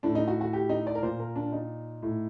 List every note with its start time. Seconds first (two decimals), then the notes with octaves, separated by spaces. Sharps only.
0.03 A2 D4
0.15 D#4
0.28 F#4
0.41 F#4
0.53 G4
0.69 D#4
0.87 D5
0.95 A#4
1.03 A#2 C5
1.19 A#4
1.36 D4
1.52 D#4
2.03 A2